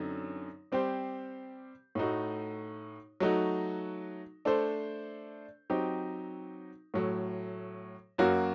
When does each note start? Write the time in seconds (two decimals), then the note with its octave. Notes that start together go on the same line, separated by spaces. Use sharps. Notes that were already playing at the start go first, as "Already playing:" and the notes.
Already playing: F#2 D3 F#3 C4 D#4
0.72 G3 C4 G4 C5
1.95 A2 A3 D#4 F#4
3.20 F#3 A3 D#4 F#4
4.45 A3 D4 A4 C5
5.70 F#3 C4 D#4 G4
6.94 A2 F#3 A3
8.18 F#2 F#3 A#3 F#4 A#4